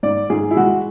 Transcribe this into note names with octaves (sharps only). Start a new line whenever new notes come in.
G#2 D5
G#2 G#4
E4
G#3 F#4